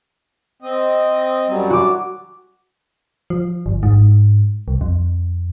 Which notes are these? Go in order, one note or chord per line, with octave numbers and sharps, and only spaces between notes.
C4 D#5
F#2 F#3 G3
F#4 D6
F3
G1
G#2
C2
F2